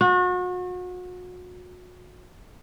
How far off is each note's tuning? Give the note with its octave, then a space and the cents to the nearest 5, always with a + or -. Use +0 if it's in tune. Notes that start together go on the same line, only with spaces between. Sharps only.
F#4 -35